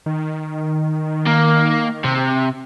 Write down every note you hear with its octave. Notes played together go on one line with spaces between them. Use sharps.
D#3
A#3
C3